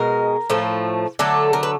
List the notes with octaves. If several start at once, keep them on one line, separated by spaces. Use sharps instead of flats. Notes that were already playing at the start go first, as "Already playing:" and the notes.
Already playing: B2 G#3 A#4
A2 F3 A3
D3 F#3 A3 A4
A#4
B4